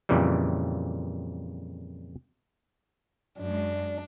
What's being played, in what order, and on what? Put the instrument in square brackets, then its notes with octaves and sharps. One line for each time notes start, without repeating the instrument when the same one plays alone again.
[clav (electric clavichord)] F2 A#2 C#3 E3 G3
[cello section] F#2 G#3 [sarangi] D4